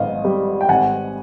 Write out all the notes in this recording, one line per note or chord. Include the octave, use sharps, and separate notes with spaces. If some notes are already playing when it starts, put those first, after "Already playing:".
Already playing: G#1 D#5 F5
G3
G5
G#1 F#5 G#5